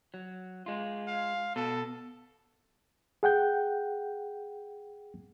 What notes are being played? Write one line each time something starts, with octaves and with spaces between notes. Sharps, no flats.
F#3
G#3 F4
F5
B2 A4
G#4 F#5 G5 G6